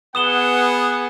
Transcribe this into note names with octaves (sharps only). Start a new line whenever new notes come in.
B3 G#4 F#5 D#6 E7 G7